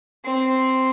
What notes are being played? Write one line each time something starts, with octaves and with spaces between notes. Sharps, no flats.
C4